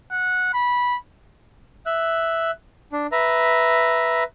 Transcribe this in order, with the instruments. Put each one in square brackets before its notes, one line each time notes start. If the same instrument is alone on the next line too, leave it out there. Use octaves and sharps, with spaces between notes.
[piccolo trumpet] F#5
B5
[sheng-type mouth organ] E5 F#6
D4
B4 E5 A#5